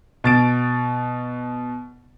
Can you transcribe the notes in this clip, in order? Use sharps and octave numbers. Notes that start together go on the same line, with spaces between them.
B2 A6 D7